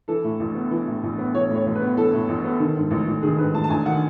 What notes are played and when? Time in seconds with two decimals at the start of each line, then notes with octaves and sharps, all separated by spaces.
0.08 E3 A4
0.24 A2
0.40 A1
0.55 B3
0.71 E3
0.87 A2
1.03 A1
1.18 B3
1.33 E3 C#5
1.50 A2
1.55 C#5
1.66 A1
1.75 B4
1.81 B3
1.96 E3 A4
2.13 A2
2.28 A1
2.44 B3
2.60 D#3
2.76 G#2
2.91 A1
3.07 A1
3.22 D#3 G#4
3.38 G#2 B4
3.54 A1 A5
3.64 A5
3.70 A1 G#5
3.86 D#3 F#5